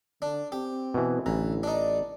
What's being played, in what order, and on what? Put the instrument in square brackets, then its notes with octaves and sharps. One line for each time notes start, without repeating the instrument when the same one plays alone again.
[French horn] D3 [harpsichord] D4
[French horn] C4 [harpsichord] G4
[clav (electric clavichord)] B2 E3
[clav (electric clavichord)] A1 A#5 [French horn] D3 [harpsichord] E3
[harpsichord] D4 D#4 [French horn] D5